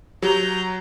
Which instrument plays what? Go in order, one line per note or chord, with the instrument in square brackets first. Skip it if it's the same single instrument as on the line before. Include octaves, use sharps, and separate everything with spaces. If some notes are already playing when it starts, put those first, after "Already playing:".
[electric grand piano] F#3 [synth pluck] F#4 G4 [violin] A#5 G6